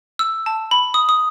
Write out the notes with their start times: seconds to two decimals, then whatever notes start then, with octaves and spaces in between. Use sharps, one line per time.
0.19 E6
0.46 A5
0.71 B5
0.94 D#6
1.09 D#6